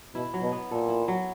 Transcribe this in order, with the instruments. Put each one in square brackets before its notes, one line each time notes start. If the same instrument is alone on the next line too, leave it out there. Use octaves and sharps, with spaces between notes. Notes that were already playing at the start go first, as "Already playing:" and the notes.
[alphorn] B2 [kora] E4
[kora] F#3
[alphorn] B2
[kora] B3
[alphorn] A#2 [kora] A4
[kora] E4
F#3